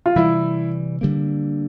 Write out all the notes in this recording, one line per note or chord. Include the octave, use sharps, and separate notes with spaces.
F4
C3 E3 G3 E4
D3 G3 A#3